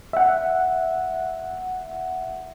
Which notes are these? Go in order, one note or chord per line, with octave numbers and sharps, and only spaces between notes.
E5 F#5